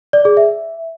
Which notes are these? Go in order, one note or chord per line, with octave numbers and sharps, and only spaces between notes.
D5
G#4
E5